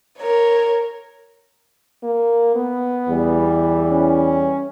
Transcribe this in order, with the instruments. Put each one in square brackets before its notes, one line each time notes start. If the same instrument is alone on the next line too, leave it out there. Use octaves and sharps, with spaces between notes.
[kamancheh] A#4 C#5
[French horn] A#3
B3
[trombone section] E2 E3 G3
[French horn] C#4